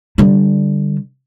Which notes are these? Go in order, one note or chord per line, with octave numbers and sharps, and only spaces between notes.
D3 G3